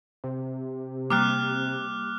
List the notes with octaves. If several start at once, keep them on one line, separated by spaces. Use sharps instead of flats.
C3
G3 A#3 D6 F6 F#6